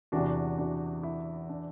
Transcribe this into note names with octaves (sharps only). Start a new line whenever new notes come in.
E2 C3 E3 D4 F#4
D4 F#4
E4
D4